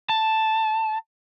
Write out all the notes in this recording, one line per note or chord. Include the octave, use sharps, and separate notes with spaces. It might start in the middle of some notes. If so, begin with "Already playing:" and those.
A5